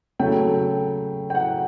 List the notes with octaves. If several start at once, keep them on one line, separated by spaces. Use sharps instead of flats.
C#3 F#3 A3 G5
G5
F#5